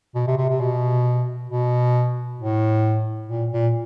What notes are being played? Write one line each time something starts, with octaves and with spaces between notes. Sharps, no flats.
B2
C3
C3
C3
B2
B2
A2
A#2
A#2